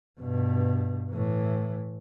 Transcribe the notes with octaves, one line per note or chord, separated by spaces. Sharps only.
G2 B2
A2 E3